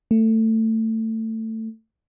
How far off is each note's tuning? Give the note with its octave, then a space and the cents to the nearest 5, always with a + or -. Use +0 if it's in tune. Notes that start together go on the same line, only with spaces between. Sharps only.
A3 +20